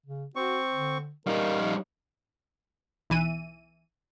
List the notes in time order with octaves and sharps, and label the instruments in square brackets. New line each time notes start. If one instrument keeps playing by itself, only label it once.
[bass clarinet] C#3
[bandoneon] C4 C#6 [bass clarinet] F#4
[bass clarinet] D3
[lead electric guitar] G3 D#4 [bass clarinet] A#4 [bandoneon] F5
[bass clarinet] F3
[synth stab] B1 E3 D#7